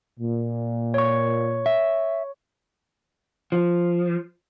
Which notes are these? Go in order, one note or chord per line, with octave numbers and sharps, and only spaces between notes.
A#2
C#5 C#6
E5
F3